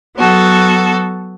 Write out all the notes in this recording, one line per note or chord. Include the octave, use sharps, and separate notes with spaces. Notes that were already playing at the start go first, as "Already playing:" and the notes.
F#3 B3 F#4 A4